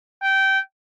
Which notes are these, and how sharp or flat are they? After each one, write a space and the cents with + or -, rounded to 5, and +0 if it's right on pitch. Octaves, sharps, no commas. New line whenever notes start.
G5 -20